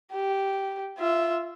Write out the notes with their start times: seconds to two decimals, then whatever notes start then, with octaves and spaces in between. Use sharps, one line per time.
0.12 G4
0.98 F4 E5